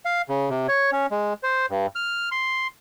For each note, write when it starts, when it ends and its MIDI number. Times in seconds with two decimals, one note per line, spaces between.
0.05 0.22 77
0.29 0.49 49
0.50 0.67 48
0.68 0.90 73
0.92 1.06 61
1.11 1.33 56
1.43 1.66 72
1.70 1.87 43
1.95 2.29 89
2.32 2.67 84